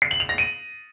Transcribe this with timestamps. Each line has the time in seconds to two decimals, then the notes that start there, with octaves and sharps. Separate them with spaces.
0.02 C7
0.11 F#7
0.20 F7
0.29 A#6
0.38 D#7